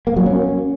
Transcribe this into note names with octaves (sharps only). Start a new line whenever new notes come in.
A#3
F#3
C#4